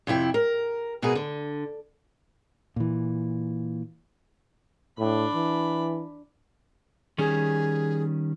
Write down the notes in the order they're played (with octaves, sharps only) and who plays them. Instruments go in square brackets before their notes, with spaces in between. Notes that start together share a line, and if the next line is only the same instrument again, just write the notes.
[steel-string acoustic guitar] F2 C3 E4 G5
A#4
B2 A#3 B3 F#4 G#4
D3
[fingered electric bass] A#2 E3
[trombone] A2 [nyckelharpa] D4 B5
[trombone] E3
[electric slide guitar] D#3 G3 C#4 [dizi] G#4